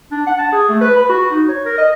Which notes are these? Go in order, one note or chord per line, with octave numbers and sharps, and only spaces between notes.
D4
F#5
A5
G#4
A3
B4
B5
F#4
D#4
C#5
A#4
D#5